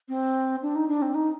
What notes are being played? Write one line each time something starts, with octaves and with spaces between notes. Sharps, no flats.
C4
D4
D#4
D4
C4
D#4